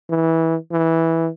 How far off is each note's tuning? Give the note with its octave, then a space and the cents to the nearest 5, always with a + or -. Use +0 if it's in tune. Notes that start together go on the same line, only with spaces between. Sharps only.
E3 -20
E3 -10